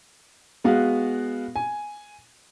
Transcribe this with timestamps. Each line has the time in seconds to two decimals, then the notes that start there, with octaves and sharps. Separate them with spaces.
0.64 G#3 B3 F#4 F5
1.56 G#5